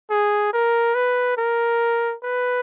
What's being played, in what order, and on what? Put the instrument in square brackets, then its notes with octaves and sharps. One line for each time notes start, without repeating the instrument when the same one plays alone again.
[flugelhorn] G#4
A#4
B4
A#4
B4